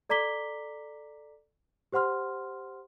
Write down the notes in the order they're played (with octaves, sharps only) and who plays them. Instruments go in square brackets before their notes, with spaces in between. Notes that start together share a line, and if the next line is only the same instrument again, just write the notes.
[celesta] A4 D5 A#5 D6 B6 G7
G4 C5 F#5 C6 F6